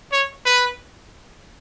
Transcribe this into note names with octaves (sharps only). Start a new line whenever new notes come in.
C#5
B4